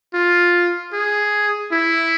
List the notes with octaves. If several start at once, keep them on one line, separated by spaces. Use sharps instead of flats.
F4
G#4
E4